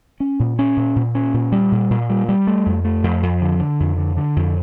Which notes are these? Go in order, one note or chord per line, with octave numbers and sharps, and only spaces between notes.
C#4
A#2
C#4
A#2
A#2
C#4
A#2
G3
A#2
A#2
G3
G3
A3
F2
A3
F2
F2
D3
D3
F2
D3
D3
F2